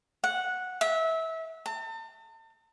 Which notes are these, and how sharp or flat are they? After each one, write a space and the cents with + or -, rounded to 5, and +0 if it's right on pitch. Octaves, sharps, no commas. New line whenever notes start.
F#5 -10
E5 -25
A5 +40